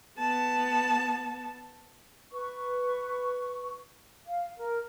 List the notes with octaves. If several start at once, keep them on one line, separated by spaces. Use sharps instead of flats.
B3 A5
B4 C#6
F5
A#4